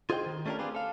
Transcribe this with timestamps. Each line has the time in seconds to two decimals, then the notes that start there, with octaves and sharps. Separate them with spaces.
0.10 F4 G#4 C5 D#5 F#5 G5
0.26 D#3
0.46 A3 C#4 D4 F#4 G4 A#4
0.59 C4 D4 F4 G4 G#4 B4
0.75 A4 F5